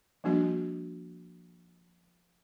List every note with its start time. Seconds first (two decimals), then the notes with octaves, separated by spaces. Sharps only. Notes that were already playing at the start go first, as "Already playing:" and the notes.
0.24 F3 G3 A#3 D4 F#4 D#5